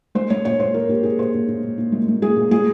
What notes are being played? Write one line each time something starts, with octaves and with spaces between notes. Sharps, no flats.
G#3 C5
G#3 C#5
A#2 C#5
A#2 C5
A#2 A#4
A#2 G4
A#2 G#4
A#2 C5
A#2
A#2
A#2
A#2
G#3
G#3
G#3 G#4
A#2
G#3 G#4